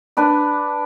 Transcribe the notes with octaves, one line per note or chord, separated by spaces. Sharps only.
D4 B4 D5